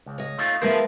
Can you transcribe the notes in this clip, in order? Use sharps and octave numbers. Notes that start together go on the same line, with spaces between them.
C#2
C#5 D#5
A3 D#4 F4
F3 G#3 A3 B3 A#4 C5